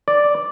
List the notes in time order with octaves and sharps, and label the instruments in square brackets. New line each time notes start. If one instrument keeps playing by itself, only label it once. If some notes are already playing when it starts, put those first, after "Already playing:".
[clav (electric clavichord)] D5